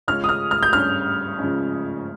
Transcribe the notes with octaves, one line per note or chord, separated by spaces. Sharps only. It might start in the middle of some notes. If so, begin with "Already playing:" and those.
C#3 G#3 C#4 F4 F6
D#6
F6
F6
G6
G2 G3 C#4 F6
C#3 F3 G#3 C#4